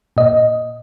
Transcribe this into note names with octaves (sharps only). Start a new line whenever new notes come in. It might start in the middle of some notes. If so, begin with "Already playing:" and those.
A#2 D#5